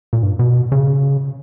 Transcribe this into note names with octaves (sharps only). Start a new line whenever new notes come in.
A#2
G2
B2
C#3